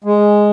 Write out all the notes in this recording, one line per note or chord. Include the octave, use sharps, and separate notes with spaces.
G#3